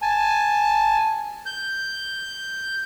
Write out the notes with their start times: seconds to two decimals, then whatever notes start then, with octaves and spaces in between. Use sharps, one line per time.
0.02 G#5 A5
1.46 G6